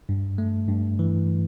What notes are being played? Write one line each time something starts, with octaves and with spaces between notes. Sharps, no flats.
G2
A3
G2
E3